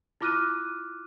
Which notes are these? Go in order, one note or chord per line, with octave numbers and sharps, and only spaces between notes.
E4 F4 D6 F6 F#6 D#7